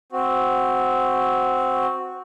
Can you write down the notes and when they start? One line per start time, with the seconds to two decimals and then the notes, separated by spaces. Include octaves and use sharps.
0.12 C4 F#4